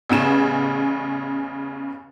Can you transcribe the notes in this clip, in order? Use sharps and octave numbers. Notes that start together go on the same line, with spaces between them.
A1 E2 C#3 E7